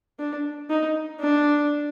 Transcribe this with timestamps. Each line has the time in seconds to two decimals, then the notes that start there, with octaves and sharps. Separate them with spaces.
0.19 D4
0.70 D#4
1.20 D4